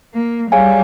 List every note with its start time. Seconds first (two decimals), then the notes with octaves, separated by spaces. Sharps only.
0.14 A#3
0.52 G3 G#4 C#5 F5 G#5